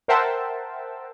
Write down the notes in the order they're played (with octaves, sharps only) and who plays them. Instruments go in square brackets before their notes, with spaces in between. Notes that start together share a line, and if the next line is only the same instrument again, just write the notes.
[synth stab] A#4 C5 E5 F#5 G5 A5